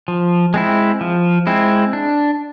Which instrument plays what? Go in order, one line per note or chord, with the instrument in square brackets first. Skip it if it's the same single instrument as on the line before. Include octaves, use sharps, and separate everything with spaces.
[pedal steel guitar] F3
G#3 C4 E4
F3
G#3 C4 E4
D4